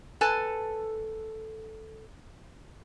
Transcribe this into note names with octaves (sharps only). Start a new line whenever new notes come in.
A4 B4 G#5 A5